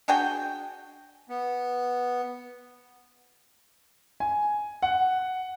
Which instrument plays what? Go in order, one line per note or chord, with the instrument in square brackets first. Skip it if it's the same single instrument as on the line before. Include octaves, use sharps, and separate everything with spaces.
[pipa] D4 F#4 G#4 G5
[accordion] B3
[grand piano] G#5
F#5